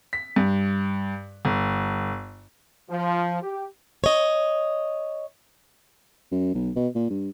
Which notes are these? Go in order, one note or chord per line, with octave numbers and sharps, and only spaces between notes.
B6
G2
G1
F3
G4
C#5 D#5
F#2
B1
B2
A#2
G2